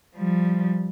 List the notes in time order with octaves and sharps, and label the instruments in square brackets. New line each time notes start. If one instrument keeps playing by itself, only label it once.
[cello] F3 G3